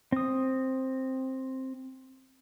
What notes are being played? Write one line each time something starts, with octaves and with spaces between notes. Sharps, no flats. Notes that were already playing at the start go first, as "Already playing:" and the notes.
C4 D#6